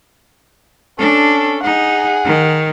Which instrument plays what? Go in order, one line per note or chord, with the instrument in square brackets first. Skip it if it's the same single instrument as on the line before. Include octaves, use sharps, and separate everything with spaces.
[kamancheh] C#4 A4 [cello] D4
[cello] D#4 [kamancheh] G#4 F#5
[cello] D#3